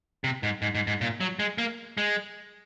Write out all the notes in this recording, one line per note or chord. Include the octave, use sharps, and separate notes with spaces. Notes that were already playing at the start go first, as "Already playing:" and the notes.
C3
G#2
G#2
G#2
G#2
A#2
F#3
G#3
A#3
G#3